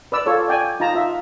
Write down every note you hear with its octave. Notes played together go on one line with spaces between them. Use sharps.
B4 D5 E6
F4 A4 C#5
D5 G5 G#5
D#4 F4 A5 A#5
F4 E5